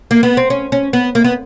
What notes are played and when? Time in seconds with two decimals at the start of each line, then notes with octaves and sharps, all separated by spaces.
0.11 A#3
0.23 B3
0.37 C4
0.50 C#4
0.72 C#4
0.93 B3
1.15 A#3
1.24 B3